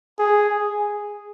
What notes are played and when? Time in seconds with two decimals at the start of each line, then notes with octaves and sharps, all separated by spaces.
0.19 G#4